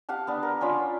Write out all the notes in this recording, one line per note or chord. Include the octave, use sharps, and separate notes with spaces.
G4 F5 F#5 A5
B3 D4
A#4
C#4 D4 F4 B5